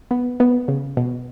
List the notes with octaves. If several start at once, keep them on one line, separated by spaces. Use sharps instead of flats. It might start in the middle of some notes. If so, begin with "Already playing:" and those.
B3
B3
C#3
B2